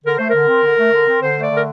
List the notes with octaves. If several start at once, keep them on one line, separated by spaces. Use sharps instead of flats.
D3 A#4
A3 C5
D3 A#4
C4
D3
A3
D3
C4
D3 C5
A3 D5
D3
A#4